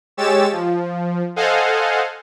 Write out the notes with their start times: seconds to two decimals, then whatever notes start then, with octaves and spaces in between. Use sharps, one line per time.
0.17 G#3 G4 C#5 E6 A6 E7
0.52 F3
1.36 A4 C5 D#5 F5 F#5 G#5